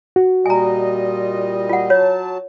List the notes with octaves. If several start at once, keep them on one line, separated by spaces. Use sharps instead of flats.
F#4
A#2 G3 D#5 G#5 A#5
F4 F#5
F#3 F4 C#5 A5